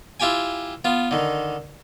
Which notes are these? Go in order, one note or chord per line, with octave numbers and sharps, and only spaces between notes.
E4 F4 G4 G5 G#5
B3 F4
D3 D#3